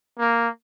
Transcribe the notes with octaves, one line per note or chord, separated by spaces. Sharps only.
A#3